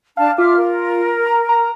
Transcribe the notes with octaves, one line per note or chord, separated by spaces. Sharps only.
D4 F5 A5
F4 E5 D6 F6
A#4
A#5
A#5